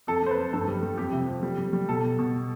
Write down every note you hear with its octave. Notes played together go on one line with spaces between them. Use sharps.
F2 A4
F2 C5
B4
F2
G2 A4
G3
G3
F2 G4
C3
F3
G3
G3
G3
B2 A4
B2
B2